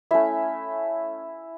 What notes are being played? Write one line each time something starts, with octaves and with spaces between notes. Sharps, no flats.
A3 C#4 E4 E5